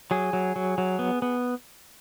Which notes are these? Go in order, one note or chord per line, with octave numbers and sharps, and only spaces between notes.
F#3 G#4
F#3
F#3
F#3
B3
B3